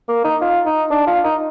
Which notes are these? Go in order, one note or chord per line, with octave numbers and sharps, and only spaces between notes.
A#3
D#4
F4
D#4
D4
F4
D#4